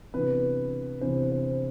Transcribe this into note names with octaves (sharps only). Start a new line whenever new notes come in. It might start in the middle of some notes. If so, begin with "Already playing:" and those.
C3 E3 B3 D4 B4
C3 E3 B3 D4 C5
C5